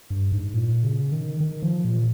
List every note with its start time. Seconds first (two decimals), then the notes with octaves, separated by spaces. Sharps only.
0.10 G2
0.32 G#2
0.54 A#2
0.83 C#3
1.12 D#3
1.40 D#3
1.62 F3
1.85 A#2